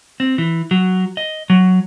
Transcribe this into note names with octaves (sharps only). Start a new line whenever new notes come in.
C4
E3
F#3
D#5
F#3